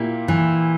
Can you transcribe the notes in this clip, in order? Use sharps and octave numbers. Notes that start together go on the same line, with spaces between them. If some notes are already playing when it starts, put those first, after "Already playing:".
Already playing: A#2 A#3 E4 G4
E3